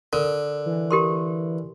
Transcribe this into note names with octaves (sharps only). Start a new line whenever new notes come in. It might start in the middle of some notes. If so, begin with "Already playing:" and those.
D3 A#4
E3
G4 A#4 C6